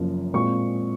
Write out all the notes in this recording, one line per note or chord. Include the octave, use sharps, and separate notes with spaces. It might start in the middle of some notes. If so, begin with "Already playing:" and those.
Already playing: F#1 F#2 F3 A#3
A#2 G#3 C4 C#6